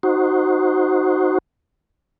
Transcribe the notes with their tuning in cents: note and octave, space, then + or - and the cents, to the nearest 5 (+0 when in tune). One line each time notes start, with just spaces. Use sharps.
D#4 +0 F#4 +0 C5 +0